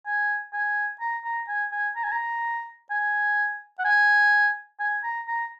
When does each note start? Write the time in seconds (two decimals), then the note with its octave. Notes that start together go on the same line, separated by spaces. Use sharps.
0.06 G#5
0.53 G#5
1.00 A#5
1.25 A#5
1.48 G#5
1.72 G#5
1.96 A#5
2.04 G#5
2.12 A#5
2.90 G#5
3.79 F#5
3.85 G#5
4.80 G#5
5.04 A#5
5.28 A#5